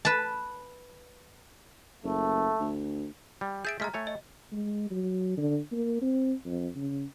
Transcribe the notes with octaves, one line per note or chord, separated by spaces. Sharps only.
B4 A5
F#1 A3
D2
G3
G#4 E5 G6 A6 D7
G#3 A3 A#5 F6 B6
A3 C#5 G#5
D#5
G#3
F#3
D3
A#3
C4
F2
C#3